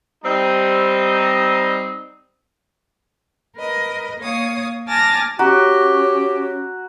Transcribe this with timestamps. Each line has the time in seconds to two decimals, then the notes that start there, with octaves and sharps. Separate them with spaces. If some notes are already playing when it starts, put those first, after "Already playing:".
0.25 G3 C4 D#4
3.56 A#4 B4 D#5
4.19 A#3 C#5 F5 D#6
4.87 G#5 A5 D6 F6 A6 A#6
5.39 C#4 F#4 G4 A#5